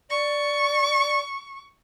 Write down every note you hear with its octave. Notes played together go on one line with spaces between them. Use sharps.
D5 C#6